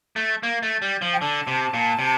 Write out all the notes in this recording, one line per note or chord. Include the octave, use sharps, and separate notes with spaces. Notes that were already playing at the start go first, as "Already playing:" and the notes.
A3
A#3
A3
G3
F3
G5
D3 A5
C3
A#2
C3